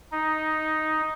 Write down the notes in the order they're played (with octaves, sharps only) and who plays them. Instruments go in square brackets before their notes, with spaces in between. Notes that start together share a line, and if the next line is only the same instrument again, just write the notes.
[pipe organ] D#4